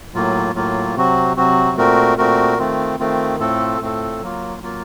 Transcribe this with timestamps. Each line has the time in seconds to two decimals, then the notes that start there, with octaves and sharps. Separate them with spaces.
0.13 A2 F#3 A#3 F4
0.54 A2 F#3 A#3 F4
0.95 C3 F#3 C4 F#4
1.37 C3 F#3 C4 F#4
1.77 A#2 A3 C4 F#4 A#4
2.18 A#2 A3 C4 F#4 A#4
2.58 D#3 A3 C4 F4
2.99 D#3 A3 C4 F4
3.40 A2 A3 C4 F4 A4
3.80 A2 A3 C4 F4 A4
4.21 F#3 A#3 F4
4.62 F#3 A#3 F4